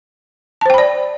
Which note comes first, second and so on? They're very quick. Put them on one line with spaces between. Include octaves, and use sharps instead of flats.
A5 C5 G5 B5 D5